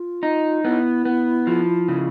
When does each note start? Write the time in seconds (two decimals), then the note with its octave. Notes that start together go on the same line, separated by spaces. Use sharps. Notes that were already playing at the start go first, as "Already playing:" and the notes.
Already playing: F4
0.23 D#4
0.64 B3 E4
1.05 B3
1.47 F3
1.88 C#3